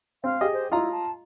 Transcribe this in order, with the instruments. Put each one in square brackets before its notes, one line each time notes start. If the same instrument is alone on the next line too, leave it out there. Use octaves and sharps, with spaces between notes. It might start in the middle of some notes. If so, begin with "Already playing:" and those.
[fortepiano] C4 [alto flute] F5
[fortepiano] G4 G#4 D#5
[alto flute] C5
[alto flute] E4 [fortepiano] F4 D#5 A#5
[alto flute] A5